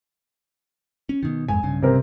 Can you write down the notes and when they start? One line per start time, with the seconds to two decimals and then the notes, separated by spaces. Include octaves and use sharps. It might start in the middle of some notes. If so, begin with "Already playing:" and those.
1.09 C#4
1.23 B2 D#3
1.49 F2 G#2 G#5
1.63 B1 G2 C#3
1.82 C3 C4 A#4